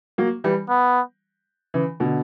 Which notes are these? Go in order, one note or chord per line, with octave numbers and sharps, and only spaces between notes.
F#3 A#3
E3 G3
B3
C#3 E3
B2 D3